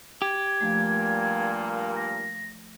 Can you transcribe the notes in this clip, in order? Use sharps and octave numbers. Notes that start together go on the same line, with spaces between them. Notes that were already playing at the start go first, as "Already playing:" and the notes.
G4 G#6
G2 A#2 F3 A3 A#3
A#6